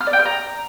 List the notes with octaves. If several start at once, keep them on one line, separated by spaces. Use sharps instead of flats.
F6
D5
G5
F6
A#5